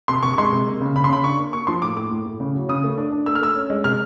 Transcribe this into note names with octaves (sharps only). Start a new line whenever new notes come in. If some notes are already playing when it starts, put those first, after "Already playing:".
C3 C6
C3 C#6
C#6
G#3 C6
C3
A#3
C#3
C#3 B5
C6
C#3 B5
D4 C#6
A#3
A#3 C#6
F3 C6
A2 D6
A2 D6
A2
A2
C#3
F#3
C#3 D#6
A3
D4
D4
A3 E6
F6
A3 E6
C#4
G#3
C3 F6